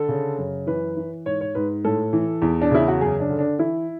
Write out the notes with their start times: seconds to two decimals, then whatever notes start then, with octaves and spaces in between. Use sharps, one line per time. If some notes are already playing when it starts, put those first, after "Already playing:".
Already playing: D3 A4
0.09 C#3
0.38 F#2
0.67 E3 B4
0.97 E3
1.25 G#2 C#5
1.41 C#5
1.55 G#2 B4
1.85 A2 A4
2.13 E3
2.42 E2
2.62 D4
2.71 C#3 E4
2.88 F#4
3.01 F#2 G#4
3.20 D4
3.30 D3
3.39 D4
3.59 E3 E4